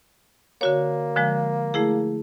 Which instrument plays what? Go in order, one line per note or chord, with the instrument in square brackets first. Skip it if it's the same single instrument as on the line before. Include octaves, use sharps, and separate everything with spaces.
[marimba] D3 F#4 C#5 [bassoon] A#3
[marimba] D3 F3 G#3
A3 E4 G#4